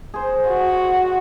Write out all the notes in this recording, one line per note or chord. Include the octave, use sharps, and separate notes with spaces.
G#4 C5
F#4